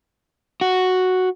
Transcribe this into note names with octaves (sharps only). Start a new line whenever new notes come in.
F#4